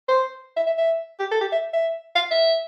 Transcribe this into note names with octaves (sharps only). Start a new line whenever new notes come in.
C5
E5
E5
E5
G4
A4
G4
E5
E5
F5
E5